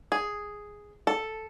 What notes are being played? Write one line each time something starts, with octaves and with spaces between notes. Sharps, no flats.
G#4
A4